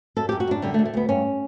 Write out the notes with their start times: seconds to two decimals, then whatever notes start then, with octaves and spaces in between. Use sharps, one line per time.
0.17 F#2 A4
0.29 F#2 G4
0.40 F#4
0.47 F#2 D4
0.62 D3 G3
0.74 A3
0.79 D2
0.85 A3
0.94 D2 B3
1.09 G2 C#4